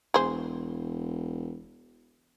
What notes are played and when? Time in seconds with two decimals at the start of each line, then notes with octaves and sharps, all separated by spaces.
0.14 E1 G#4 C5